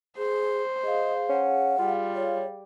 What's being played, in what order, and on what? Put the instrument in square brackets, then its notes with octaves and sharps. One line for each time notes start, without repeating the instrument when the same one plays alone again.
[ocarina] G#4 [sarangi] C5
[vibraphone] G#4 F5 [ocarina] D#5
[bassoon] C#4 [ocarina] F#5
[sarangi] G3 [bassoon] F4
[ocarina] C#5